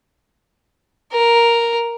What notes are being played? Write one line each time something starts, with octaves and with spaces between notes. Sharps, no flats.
A#4